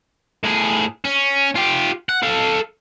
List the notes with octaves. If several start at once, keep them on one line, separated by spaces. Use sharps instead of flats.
A2 G#4
C#4
F4 G4
F#5
A4 F5